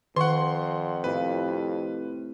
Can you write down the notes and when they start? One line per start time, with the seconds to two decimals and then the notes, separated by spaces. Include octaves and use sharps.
0.16 F2 D#3 F#5 C6 C#6
1.04 A2 C3 F4 B4